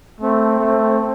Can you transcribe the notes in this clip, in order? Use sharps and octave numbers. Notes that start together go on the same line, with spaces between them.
A3 C4
A3